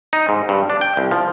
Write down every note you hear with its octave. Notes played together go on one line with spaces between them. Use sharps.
D#4
G#2
G2
D4
G5
C2
F3